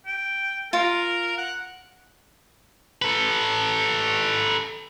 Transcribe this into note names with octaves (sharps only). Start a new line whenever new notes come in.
G5
F4 A#4
F#5
A4 B4